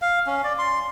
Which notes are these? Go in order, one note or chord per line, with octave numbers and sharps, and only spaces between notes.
F5
C#4
D5
C6